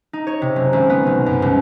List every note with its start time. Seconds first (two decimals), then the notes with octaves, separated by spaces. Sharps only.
0.13 D#4
0.27 C#5
0.42 C3
0.56 F#1
0.73 G#1
0.90 B3
1.06 B1
1.26 F#2
1.42 C2